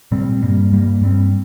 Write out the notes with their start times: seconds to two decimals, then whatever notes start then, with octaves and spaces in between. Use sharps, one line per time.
0.12 A#2 G3 C4
0.42 G2 G3 A#3
0.72 G2 G3 A#3
1.01 G2 G3 C4